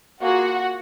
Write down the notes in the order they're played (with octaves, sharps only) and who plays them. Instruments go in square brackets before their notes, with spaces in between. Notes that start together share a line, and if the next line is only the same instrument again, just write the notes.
[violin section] A#3 F4 F#4 G#4 F#5